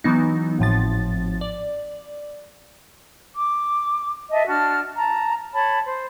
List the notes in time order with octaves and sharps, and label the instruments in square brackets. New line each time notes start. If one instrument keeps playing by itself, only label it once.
[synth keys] E3 F#3 B3 D#4
G#1 A2 F3 A6
D5
[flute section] D6
D#5 E5 A5
D4 F#4 A5 F6
A5 A#5
C#5 A5 B5
C5